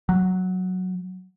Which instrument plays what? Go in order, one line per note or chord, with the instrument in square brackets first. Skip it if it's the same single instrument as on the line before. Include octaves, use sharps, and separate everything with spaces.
[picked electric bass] F#3